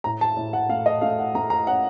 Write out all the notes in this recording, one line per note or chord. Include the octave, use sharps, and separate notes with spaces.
A2 A#5
A5
A2
F#5
A3 F5
D#5
A3 F5
F#5
A3 A#5
A#5
C#4 F#5